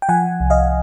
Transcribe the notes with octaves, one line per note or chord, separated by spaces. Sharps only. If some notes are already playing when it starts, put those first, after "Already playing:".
G5
F3 F#5 G#5
C2
D#5 F5